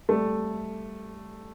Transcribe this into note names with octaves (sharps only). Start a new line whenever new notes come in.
G3 A3